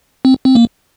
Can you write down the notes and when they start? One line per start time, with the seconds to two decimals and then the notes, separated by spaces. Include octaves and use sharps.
0.25 C4
0.45 C4
0.55 A#3